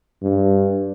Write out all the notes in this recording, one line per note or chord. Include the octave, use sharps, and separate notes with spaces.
G2